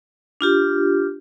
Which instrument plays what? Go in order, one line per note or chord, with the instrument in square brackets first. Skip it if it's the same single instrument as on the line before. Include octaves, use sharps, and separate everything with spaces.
[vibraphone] D4 F4 G4